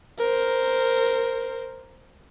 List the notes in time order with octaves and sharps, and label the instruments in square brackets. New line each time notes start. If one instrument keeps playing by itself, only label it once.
[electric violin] A#4 C5